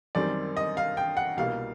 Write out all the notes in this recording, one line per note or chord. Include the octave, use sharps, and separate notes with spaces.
F#2 D#3 G3 C4 D5
D#5
F5
G5
F#5
C2 B2 G3 A#3 F5